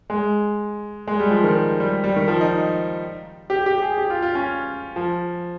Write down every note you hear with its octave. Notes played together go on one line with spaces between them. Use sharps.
G#3
G#3
G3
F3
D#3
G3
G3
D#3
F3
D#4
G4
G4
G#4
G4
F4
F4
C#4
F3